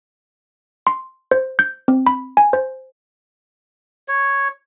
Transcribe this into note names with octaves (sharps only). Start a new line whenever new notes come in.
C6
C5
G6
C4
B5
G#5
C5
C#5